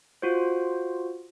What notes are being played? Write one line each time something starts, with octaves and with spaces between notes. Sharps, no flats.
F4 F#4 C5